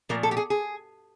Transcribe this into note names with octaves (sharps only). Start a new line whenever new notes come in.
A#2 F3 A3 A#4
A4
G4
G#4
G#4